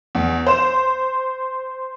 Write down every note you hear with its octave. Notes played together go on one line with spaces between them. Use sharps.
E2
C5 E7